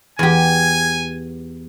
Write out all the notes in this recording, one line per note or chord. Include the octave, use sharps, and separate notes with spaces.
E2 G4 G#5